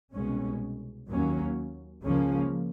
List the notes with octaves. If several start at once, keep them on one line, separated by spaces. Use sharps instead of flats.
C2 B2 G#3 C#4
D#2 D#3 F#3 A#3 C#4
C#2 C#3 F3 A#3 C#4